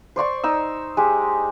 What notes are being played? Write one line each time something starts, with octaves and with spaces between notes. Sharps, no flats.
C5 D5 C6 C#6
D#4 E6
G#3 G4